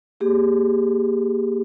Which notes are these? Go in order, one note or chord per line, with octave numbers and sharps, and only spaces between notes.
A#3 G4 G#4